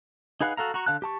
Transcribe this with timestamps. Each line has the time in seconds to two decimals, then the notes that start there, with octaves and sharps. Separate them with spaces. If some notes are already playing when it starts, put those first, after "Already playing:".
0.41 D#4 G#4 B4 F5 F#5
0.57 F#4 A4 F5 A#5
0.74 F#4 A#5 C#6
0.86 D3 F5 A5 F#6
1.02 G4 A5 C#6